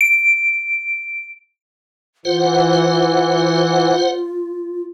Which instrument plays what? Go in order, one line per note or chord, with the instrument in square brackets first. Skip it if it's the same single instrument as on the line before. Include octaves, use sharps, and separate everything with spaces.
[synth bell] D7
[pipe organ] E3 [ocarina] F4 [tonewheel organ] C5 F#5